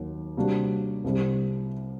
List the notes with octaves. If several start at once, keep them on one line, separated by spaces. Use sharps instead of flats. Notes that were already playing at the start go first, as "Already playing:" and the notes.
Already playing: D#2 D#3 F#3
C3 G3 A#3 D4 F#4
C2 C3 G3